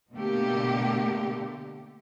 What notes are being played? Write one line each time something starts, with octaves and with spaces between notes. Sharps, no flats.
B2 D3 A3 A#3 G4